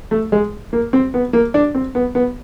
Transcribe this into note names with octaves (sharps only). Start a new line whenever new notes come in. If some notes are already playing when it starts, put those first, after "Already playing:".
A3
G#3
A#3
C4
B3
A#3
D4
C4
B3
B3